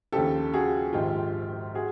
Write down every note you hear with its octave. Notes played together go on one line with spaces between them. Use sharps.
D#2 C#3 F3 G4 A4
F#4 G#4
A#1 G#2 D#3 F4 G4
F#4 G#4